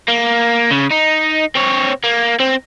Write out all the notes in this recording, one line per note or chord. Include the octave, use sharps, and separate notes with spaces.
A#3
C#3
D#4
C4 C#5
A#3
C4